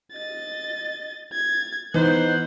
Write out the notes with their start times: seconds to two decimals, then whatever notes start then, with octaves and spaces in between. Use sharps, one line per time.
0.13 D#5 A6
1.33 G#6 A6
1.94 E3 B3 D#4 C5 F#6